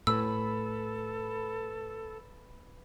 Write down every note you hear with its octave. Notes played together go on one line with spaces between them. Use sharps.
A2 A4 B4 B5 E6